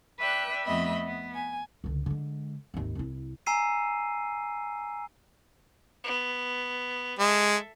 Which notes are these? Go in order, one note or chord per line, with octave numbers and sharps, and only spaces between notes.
B4 D5 E5 G5 F#6
F2 A3 B3 D#5 E5 B5
B3
G#5
C#2 D3
D3 G#3
G#1 D#2
C2 E4
G#5 A#5 E6 C7 D#7
B3
G#3 A4 E5